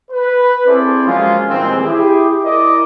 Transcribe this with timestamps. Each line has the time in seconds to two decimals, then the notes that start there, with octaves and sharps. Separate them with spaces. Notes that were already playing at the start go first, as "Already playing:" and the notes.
0.12 B4
0.67 C4 E4 G#4 A4 C5 D5
1.07 F3 F#3 G#3 A#3 C#4 F4
1.49 A#2 D#3 E3 G3 G#3 C4
1.85 E4 G4 G#4
2.43 E4 A#4 D5 D#5